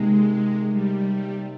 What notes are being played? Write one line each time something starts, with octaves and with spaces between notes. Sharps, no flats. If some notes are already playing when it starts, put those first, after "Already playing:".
Already playing: C3 D#3 G#3 A#3
G3